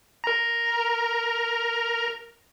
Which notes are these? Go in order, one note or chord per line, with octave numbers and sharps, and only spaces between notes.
A#4 A#5